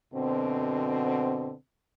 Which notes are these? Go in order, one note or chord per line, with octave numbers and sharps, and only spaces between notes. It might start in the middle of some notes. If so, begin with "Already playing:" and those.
F#2 B2 D3 C4